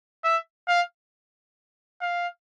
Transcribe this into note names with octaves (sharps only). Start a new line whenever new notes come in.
E5
F5
F5